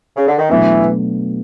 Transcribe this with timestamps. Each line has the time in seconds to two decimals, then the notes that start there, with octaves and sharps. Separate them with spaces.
0.17 C#3
0.28 D3
0.38 D#3
0.49 B2 E3 F#3 A3 D4